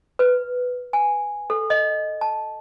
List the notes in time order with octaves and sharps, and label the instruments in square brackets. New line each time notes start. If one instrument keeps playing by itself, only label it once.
[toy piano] B4
G#5
A4
D#5
A5